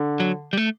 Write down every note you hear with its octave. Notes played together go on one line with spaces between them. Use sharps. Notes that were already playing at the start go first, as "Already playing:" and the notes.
Already playing: D3
F#3
G3
A3